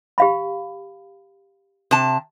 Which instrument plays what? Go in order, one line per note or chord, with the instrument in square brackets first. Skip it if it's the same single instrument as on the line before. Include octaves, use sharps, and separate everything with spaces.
[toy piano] G4 F5 B5
[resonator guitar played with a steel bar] C3 A5